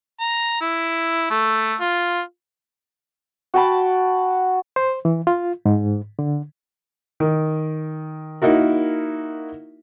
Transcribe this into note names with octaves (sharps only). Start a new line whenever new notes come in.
A#5
E4
A3
F4
F#4 G5 A5 B5
C5
E3
F4
G#2
D3
D#3
A#3 D#4 E4 F#4 A#4